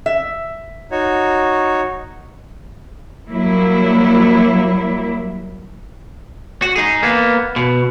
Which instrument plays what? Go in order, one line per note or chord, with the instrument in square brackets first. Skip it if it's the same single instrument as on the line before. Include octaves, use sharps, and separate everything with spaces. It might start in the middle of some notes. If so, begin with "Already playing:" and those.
[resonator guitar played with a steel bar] E5
[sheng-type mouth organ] D#4 F#4 C#5
[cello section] F#3 G3 A#3 E4
[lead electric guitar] F#4
D#4 G#4
A#3 B3
B2